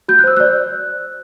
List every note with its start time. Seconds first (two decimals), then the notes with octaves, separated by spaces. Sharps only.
0.08 F#4 G6
0.19 F#6
0.24 C5 E6
0.37 D5 F#6